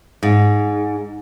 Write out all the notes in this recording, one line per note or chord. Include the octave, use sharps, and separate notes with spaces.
G#2